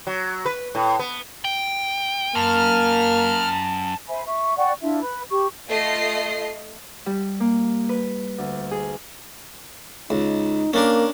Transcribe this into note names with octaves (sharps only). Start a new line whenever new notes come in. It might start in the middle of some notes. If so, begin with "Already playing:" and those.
F#3
B4
A2
B3
G5
F#2 A#3 A5 F6
C5 E5 G#5 B5
E5 C#6
D5 F#5 G5 C#6
D4 E4 F4 E5
B4 B5
G4 C#6
A3 F4 D#5 C7
G3
A#3
B4
D2
G#4
C#2 D#4
A#3 C#4 D4 A#4